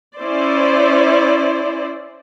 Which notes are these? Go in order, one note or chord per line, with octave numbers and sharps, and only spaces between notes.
C#4 E4 C5 D5